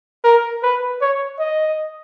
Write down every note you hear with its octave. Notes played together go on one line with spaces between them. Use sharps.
A#4
B4
C#5
D#5